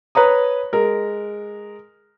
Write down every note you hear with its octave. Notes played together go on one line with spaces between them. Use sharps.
B4 C#5 A#5 D#6
G#3 A#4